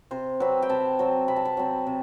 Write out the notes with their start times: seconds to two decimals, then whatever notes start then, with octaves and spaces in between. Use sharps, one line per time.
0.11 C3 C5
0.40 F#3 C4 B4
0.62 G5
0.69 C3 A5
0.99 F#3 C4
1.28 C3 B5
1.36 A5
1.45 B5
1.57 F#3 C4
1.87 C3